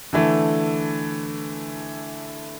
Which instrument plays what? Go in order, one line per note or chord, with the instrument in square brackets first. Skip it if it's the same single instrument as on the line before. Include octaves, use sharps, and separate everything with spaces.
[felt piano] D3 E3 A3